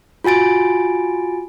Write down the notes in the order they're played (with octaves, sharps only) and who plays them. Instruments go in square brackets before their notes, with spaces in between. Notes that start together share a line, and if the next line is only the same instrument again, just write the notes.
[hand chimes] F4 F#4 G#5 A6 D7